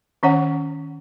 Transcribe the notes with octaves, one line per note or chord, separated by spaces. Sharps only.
D#3 C#4 C#5 F#5